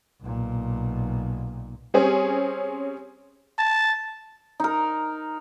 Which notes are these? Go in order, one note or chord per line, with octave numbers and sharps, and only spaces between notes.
B1 A#2
G3 C4 C#4 G#4
A5
D#4 A#4